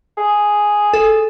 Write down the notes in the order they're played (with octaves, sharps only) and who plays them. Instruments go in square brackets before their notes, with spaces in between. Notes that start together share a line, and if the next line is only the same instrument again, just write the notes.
[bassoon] G#4
[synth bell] A4